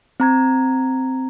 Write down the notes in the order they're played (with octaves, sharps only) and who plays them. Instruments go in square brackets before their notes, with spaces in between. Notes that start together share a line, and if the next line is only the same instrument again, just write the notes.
[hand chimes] C4 A#5 G#6